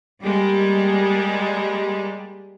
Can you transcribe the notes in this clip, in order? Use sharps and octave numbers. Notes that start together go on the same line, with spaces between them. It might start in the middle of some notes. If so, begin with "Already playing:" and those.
G3 G#3 A#3